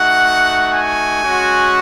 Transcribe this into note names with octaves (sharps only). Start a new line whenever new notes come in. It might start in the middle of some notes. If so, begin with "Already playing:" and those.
Already playing: A3 D#4 F#4 F#5
G#5
G#3 C#4 F#4